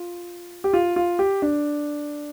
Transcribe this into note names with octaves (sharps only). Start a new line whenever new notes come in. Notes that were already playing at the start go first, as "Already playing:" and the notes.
Already playing: F4
G4
F4
F4
G4
D4